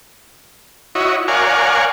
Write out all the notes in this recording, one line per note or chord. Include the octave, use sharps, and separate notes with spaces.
E4 F#4 C#5 D#5
A#4 C#5 D5 F5 F#5 G#5